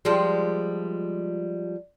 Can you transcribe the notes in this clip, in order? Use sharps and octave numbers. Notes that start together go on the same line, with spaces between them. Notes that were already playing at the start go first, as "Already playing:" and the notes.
F3 G3 G#3